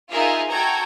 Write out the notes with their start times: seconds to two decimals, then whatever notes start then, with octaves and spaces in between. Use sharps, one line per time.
0.11 D#4 F4 G#4 A#4 E5 F5
0.50 F#4 A4 G5 A#5 G#6